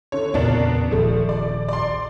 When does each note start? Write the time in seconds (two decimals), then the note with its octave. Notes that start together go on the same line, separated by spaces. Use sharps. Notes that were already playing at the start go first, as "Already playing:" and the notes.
0.12 D3 C#5
0.34 E2 A#2 C#3 B3 D4 A#4
0.91 D#1 A#1 D#2 F3 A3
1.29 D5
1.69 D5 C6